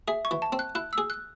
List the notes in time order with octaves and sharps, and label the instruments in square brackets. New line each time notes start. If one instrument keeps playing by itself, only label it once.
[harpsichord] G#4 [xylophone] E5
[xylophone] C#6
[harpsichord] E3
[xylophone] A5
[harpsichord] C4
[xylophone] F#6
[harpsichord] E4 [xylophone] F#6
[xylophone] E6
[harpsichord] G#4
[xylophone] F#6